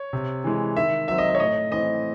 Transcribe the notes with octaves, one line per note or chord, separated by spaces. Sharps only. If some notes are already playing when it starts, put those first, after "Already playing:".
Already playing: C#5
C3
E3 G#3
D#3 E5
F#3 C4 E5
D#5
E5
C#5
A2 D#5
E3 C4 D#5